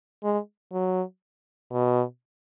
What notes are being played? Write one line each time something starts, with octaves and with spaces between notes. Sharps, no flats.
G#3
F#3
B2